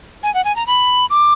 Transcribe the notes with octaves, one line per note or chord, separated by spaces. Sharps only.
G#5
F#5
G#5
A#5
B5
D6